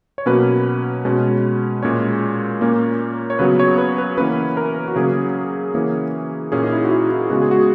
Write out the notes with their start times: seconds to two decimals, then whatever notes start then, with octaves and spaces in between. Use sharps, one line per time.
0.18 C#5
0.26 B2 F#3 A#3 C#4 B4
1.05 B2 G#3 C#4
1.83 A#2 G#3 C#4 C#5
2.61 A#2 A#3 C#4
3.30 C#5
3.39 C#3 F#3 B3 B4
3.60 C#5
3.78 B4
3.98 B4
4.18 E3 A#3 C#4 B4
4.57 A#4
4.88 F#4
4.96 C#3 F#3 A#3 C#4 G#4
5.74 E3 A#3 C#4
6.52 A#2 A#3 C#4 G#4
6.63 D#4
6.72 E4
6.84 F#4
6.91 E4
7.11 E4
7.30 C#3 G#3 B3 F#4
7.41 G#4
7.51 F#4